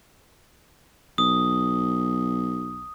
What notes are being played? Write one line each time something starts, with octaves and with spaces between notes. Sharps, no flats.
B1 D#6